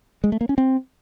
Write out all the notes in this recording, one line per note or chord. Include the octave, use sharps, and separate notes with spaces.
G#3
A3
A#3
C#4
C4